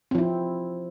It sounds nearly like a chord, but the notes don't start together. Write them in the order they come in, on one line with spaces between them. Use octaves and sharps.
C4 F3 E4